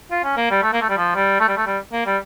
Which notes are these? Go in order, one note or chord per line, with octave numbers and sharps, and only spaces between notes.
F4
C#4
A#3
G3
A3
A#3
A3
G3
F3
G3
A3
G3
A3
G3
A#3
G3